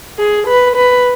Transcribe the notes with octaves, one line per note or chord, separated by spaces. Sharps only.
G#4
B4
B4